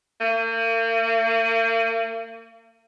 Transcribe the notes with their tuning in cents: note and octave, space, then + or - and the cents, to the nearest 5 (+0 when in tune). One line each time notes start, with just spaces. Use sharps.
A#3 -40